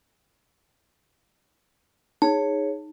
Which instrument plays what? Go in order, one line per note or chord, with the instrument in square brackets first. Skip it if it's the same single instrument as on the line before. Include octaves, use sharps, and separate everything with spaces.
[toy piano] D#4 [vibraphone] G#4 C#5